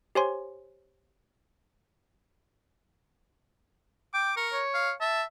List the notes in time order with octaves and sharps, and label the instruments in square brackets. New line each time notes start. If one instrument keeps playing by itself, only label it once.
[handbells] G4 C5 C#5 G#5 C6
[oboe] G5 [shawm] D6
[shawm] A#4 [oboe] C#6
[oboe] C#5
[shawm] F5
[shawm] E5 [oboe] A5